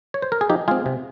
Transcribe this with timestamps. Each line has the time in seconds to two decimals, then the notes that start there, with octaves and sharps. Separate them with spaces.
0.14 C#5
0.22 C5
0.32 A#4
0.41 G#4
0.50 F3 D#4 G4
0.68 G#3 C4 F4 G#4
0.86 C3